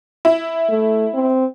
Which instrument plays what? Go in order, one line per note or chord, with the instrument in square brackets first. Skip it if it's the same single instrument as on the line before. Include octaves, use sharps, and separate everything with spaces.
[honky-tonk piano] E4
[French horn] A3
C4